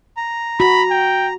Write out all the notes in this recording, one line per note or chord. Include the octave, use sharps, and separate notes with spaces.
A#5
F#4 B5
G5